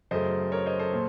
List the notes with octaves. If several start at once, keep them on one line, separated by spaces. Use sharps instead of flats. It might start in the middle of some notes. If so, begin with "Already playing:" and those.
F#2 C#3 A3 C5 D#5
A#4 C#5
C5 D#5
A4 C5
A#2